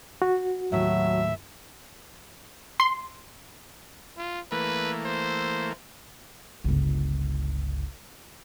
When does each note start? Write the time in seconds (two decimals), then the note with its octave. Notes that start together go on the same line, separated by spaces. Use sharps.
0.22 F#4
0.72 D#2 A2 F#3 E5
2.80 C6
4.17 F4
4.52 E3 A3 A#3 B4
5.05 C5
6.64 G1 C#2